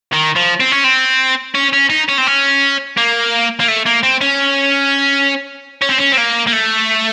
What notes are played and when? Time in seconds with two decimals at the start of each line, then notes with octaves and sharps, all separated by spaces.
0.13 D#3
0.36 F3
0.60 C4
0.72 C#4
0.84 C4
1.55 C#4
1.73 C#4
1.90 D#4
2.09 C#4
2.18 C4
2.27 C#4
2.97 A#3
3.60 A#3
3.68 A3
3.86 A#3
4.03 C4
4.21 C#4
5.82 C#4
5.89 C4
5.98 C#4
6.12 C4
6.17 A#3
6.47 A#3
6.53 A3